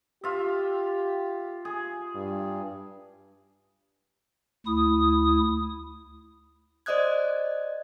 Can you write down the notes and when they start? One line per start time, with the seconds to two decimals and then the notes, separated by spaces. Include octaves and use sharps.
0.24 F4 G4 E5
1.65 G#4
2.15 G2
4.66 D2 E4 D#6
6.86 C5 D5 D#5 D#6 F#6 G#6